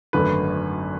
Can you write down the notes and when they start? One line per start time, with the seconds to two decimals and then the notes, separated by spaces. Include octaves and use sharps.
0.13 G#1 F#2 D3 A3 B4